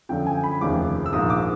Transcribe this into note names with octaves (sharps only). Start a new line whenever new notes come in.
F#2 D3 F3 G5
G#5
B5
F1 D#2 C#3 F3 D6
E6
A#1 G#2 F3 A#3 D#6
D6